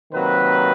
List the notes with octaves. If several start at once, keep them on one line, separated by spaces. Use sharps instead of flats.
C3 D#3 F#3 A#3 B4